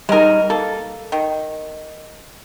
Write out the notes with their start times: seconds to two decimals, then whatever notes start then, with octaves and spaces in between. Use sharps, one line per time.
0.09 G3 G#3 D#4 A#4
0.50 A#3 A4
1.12 D#3